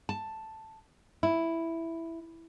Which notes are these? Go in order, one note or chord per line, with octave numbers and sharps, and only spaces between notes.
A5
E4